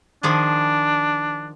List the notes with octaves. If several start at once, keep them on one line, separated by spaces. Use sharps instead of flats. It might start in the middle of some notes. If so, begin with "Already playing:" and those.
D#3 F3 D4 G#4